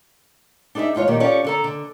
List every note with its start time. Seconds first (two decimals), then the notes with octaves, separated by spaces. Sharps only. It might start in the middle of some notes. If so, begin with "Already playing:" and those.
0.75 D4 D#4 G#4 B4 E5
0.95 D#2 G#2 F4 C#5
1.08 A#2 D#3 A#3 G4
1.20 C#4 F4 G4 A4 C#5 D5
1.44 D3 A4 A#5
1.64 D3